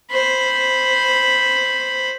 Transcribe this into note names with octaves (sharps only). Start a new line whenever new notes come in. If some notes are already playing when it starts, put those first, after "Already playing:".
C5 B5